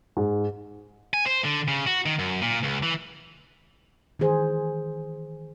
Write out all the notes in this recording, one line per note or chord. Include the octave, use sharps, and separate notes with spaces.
G#2
G#5
C5
D3
C#3
F#4
D#3
F#2
A#2
C#2
E3
D#3 E3 G#4 C5